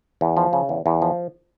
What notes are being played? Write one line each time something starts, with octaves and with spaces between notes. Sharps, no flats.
E2
F3
C#3
E2
E2
F3